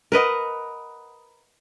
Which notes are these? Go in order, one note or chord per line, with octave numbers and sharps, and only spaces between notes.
A#4 B4 D#5 F#5